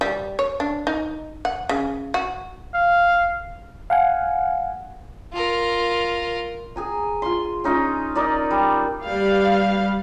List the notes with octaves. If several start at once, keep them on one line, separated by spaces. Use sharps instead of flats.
G3
C#5
D4
D#4
F#5
C#3
F#4
F5
F5 F#5 G#5
F4 A#4
G#4 G#5 A#5
F4 C6
C#4 D#4 F4 D#5
D#4 A#4 D5 D#5
G3
G3 B4 F5